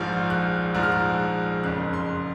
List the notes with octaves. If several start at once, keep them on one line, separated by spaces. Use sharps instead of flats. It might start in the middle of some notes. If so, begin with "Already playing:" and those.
Already playing: A#1 G#2 F3 F6
F#6
A#1 G#2 F3 F#6
F6
F#6
F#1 F2 C#3 F#6
C6